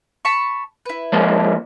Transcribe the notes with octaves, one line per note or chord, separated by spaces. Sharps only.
A5 B5 C#6
E4 B4
F3 G#3 A#3